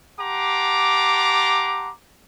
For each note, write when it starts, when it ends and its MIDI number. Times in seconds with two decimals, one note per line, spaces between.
0.19 1.90 67
0.19 1.90 78
0.19 1.90 81
0.19 1.90 82
0.19 1.90 84
0.19 1.90 86